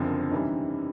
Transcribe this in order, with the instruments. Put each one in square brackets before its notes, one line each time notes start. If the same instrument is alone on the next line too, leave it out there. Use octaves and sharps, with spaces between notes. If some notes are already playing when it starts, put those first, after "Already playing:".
Already playing: [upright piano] F#1 F#2 D3 F3 [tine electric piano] C4 D4
[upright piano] C3 E3 G3 [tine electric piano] C#4 D#4